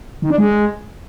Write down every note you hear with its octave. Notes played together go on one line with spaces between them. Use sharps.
D#3
D4
G#3